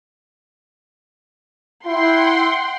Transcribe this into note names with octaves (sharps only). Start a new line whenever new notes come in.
E4 F#5 G5 C6